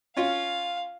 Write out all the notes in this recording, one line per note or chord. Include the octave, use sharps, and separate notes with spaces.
C#4 F4 F5